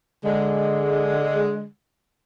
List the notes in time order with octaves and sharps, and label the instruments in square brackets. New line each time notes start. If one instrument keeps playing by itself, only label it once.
[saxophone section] D3 G#3